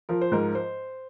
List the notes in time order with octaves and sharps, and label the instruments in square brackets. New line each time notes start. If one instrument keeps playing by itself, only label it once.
[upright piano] F3 [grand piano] A#4
[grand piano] C5
[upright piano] G#2 [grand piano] A#4
[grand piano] C5